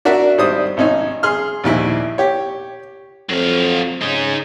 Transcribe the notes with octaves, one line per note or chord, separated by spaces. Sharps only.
D4 F#4 A#4 E5
G#1 G3 C5 D#6
G#1 C#4 D#4
G#4 C6 F6
A#1 D#2 E4
G4 C#5
F2 F#3 F5
C#3 D#4 G#4